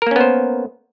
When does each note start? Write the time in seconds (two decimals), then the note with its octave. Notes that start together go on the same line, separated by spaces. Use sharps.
0.02 A#4
0.07 A#3
0.11 C#4
0.16 B3
0.21 C5